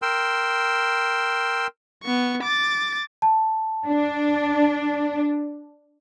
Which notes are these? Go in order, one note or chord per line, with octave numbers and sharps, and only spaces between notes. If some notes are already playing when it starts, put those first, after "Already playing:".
A#4 G5 C6 E6
B3 C#6
D6 A6
A5
D4